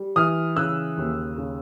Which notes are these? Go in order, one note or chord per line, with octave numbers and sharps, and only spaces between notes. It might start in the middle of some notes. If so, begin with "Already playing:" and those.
Already playing: G3
E3 D#6 F6
C#3 E6 F#6
D#2
C#3